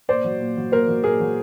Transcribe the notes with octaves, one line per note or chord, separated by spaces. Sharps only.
A#2 C5 D5
F#3
A#2
F#3
A#2 A#4 C5
F#3
A#2 G#4 A#4
F#3